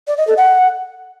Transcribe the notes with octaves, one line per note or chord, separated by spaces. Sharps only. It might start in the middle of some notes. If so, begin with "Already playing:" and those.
D5
D#5
A4
F#5